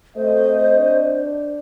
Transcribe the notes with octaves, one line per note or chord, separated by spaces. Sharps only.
A3 C4 F#4 C5 D#5
D4